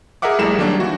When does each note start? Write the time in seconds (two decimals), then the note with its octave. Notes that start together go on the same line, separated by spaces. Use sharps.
0.22 G#4 A#4 D#5 E5 F#5 D6
0.39 A#1 G3 A3 E4 G#4 E7
0.58 D#3 F#3 G3 A#3 D4
0.80 E3 F#4